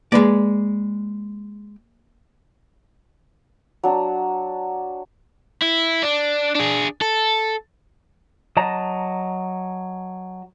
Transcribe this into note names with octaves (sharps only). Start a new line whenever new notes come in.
G#3 A#3 B4 D5
F#3 D4
E4
D4
D4 G#4
A4
F#3 D#5 A5 A#5